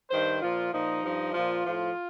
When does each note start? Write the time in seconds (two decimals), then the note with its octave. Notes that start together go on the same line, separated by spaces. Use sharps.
0.11 G2 D#3 C5
0.42 A#2 F3 F4
0.73 A#2 F3 D#4
1.03 G2 F3
1.33 A#2 F3 F4
1.65 A2 F3